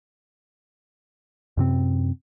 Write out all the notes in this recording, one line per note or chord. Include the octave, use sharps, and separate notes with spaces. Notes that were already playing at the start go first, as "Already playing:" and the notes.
F#2 C3 C4